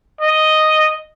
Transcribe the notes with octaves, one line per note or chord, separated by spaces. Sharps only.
D#5